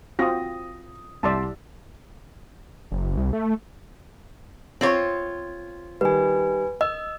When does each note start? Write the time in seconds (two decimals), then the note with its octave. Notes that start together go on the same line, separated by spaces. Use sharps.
0.19 C4 F4 F#4 D#6 A#6
1.23 C2 D5 E5 A5 C6
2.92 F#1
3.17 C2
3.33 A3
4.81 C4 F4 C#5
6.01 D#3 G3 B4 G#5
6.81 D#5 E6